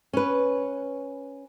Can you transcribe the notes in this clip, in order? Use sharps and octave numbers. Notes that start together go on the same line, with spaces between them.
C#4 B4